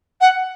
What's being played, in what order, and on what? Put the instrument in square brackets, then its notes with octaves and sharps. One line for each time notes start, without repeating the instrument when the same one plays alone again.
[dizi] F#5